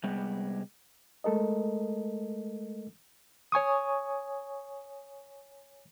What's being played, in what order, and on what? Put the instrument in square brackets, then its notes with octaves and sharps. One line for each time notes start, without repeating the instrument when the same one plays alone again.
[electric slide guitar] C3 G3 G#3 B3
[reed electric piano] G#3 A3 A4 A#4 D#5
C#5 G#5 C#6 D#6